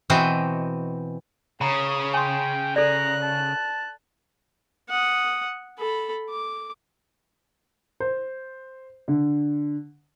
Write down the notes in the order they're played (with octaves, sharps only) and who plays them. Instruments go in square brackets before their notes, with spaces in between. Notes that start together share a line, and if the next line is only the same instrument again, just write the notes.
[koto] B2 E3 C4 F#4 D#5 G5
[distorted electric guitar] C#3 [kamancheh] C#5 D#6 [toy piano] A#5 B5
[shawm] G5 [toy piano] G#5 C6
[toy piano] A4 D5 [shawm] A#5 [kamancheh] F#6
[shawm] A5
[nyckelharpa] F#5 D#6
A4 B5
D6
[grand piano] C5
D3